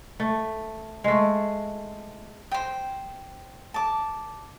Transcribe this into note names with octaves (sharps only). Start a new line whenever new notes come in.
A3
G#3 A3
C5 G5
A5 D6